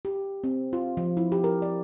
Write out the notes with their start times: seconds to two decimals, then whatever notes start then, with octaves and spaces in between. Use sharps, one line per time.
0.05 G4
0.44 C4
0.73 F4
0.97 F3
1.17 E4
1.32 G4
1.44 A#4
1.62 D5